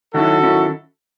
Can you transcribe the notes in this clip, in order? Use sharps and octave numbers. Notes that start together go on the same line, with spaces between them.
D#3 F#3 C#4 E4 F#4 A4
D#3 F#3 C#4 E4